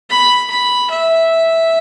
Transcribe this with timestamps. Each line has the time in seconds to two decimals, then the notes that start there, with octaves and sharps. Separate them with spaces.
0.10 B5
0.50 B5
0.90 E5